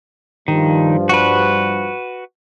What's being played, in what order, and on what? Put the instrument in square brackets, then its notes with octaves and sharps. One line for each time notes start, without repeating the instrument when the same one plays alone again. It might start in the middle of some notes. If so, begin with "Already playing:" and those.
[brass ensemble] G2 F3 [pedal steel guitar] D#3
[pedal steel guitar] F#4 B4